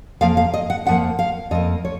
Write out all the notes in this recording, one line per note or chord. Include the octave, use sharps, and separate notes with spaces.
F2 F3 A#3 F5
F5
D#5
F#5
F2 F3 A#3 F#5
F5
F2 F3 A#3 D#5
C#5